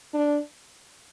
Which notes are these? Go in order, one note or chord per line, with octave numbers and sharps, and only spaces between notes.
D4